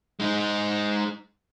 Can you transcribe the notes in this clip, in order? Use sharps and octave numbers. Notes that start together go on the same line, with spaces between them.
G#3 D#4